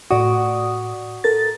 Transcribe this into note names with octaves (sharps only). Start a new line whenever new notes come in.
A2 F#4 D5 D#6
A4 A#4 A6